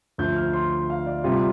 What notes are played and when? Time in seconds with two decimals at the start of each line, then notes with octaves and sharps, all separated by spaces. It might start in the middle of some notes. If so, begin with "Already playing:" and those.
0.18 D2 D3 F3 A3 G6
0.36 F6
0.53 C6
0.90 F5
1.06 D5
1.24 C3 G3 F4